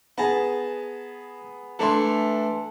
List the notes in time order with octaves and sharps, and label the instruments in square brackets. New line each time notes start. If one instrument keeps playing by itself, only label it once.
[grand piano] B3 G#4 [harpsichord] A5 A#5
[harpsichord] E3 A3 D4 [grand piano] A5 C6